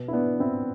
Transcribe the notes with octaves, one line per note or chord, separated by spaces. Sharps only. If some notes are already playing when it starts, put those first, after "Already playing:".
Already playing: B2
E4
B3 D4
C4 E4